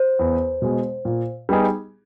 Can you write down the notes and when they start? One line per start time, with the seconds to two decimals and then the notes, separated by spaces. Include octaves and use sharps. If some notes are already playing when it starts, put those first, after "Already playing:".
Already playing: C5
0.19 E2
0.62 B2 G#3
1.05 A#2
1.49 G3 B3 D#4 G#4